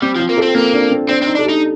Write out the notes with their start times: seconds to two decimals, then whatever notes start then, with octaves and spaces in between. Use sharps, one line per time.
0.02 G3 C4
0.15 F3 F4
0.29 A#3
0.38 C4 A4
0.55 A#3 C4
0.74 D4
0.91 C4
1.08 C4 D4
1.22 C4
1.26 D#4
1.35 D4 A4
1.44 G4
1.49 D#4